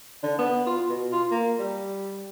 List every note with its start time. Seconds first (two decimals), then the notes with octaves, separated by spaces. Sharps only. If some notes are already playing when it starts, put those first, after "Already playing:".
0.23 D3
0.39 B3
0.67 F4
0.89 B2
1.12 F4
1.31 A#3
1.59 G3